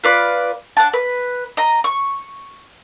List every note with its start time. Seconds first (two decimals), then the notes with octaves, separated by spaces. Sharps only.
0.04 F4 B4 D5
0.77 D4 F#5 A5
0.93 B4
1.57 D#5 A#5
1.84 C#6